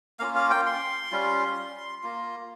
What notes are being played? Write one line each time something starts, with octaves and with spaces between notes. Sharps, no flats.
A#3 C#4 F4 F5
F5
G5
C6
G3 C#4 F4
A#3 F4